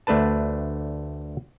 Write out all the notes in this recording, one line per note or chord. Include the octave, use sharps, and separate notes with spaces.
D2 A3 D4 B4 A5